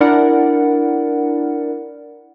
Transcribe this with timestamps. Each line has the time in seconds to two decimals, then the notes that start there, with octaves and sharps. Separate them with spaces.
0.01 D4 E4 A#4 D5 F#5